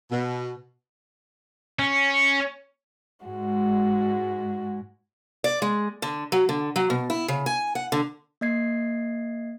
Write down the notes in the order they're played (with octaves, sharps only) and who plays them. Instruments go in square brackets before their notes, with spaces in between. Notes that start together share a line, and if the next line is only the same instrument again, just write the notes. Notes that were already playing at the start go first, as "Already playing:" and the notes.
[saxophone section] B2
[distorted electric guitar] C#4
[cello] G#2 G#3 [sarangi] F#4
[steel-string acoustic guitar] D5
G#3
D3
F#3
D3
F#3
B2
E4
C#3
G#5
F#5
D3
[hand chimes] A#3 D#5 G#6 C7